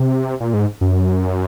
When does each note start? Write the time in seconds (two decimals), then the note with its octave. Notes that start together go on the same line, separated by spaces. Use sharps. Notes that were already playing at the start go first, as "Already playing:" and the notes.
Already playing: C3
0.40 A#2
0.54 G#2
0.81 F#2